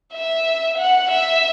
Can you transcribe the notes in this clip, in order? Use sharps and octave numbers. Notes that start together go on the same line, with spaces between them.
E5
F#5
E5